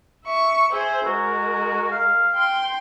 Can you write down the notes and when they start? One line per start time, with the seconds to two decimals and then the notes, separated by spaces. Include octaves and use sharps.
0.25 E5 C#6
0.72 G#4 C5 E5
1.06 G#3 F#4 A#4
1.91 F5
2.35 G5 C6